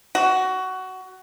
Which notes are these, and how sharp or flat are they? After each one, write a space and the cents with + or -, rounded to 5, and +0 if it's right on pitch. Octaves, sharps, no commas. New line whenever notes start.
F#4 +15